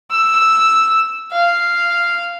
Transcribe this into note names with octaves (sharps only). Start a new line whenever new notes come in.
E6
F5